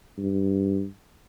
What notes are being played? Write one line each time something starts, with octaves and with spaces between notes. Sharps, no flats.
G2